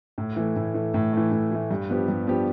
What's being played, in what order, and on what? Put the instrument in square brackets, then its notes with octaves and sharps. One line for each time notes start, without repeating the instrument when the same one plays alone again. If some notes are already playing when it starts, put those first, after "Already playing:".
[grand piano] A2
E3 A3
A2
E3 A3
A2
E3 A3
A2
E3 A3
G2
F3 B3 D4 G4
G2
F3 B3 D4 G4